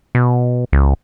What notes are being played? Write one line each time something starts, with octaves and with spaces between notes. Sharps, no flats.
B2
C#2